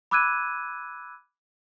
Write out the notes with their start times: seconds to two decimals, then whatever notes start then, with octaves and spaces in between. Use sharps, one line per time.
0.11 B5 D6 E6 F#6 G#6 D#7